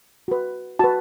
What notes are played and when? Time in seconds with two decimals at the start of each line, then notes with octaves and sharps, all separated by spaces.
0.28 F#4 B4
0.79 F#4 B4 A5